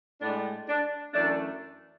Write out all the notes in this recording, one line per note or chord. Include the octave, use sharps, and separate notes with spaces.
A2 G#3 D4
D4
F#2 E3 A3 D4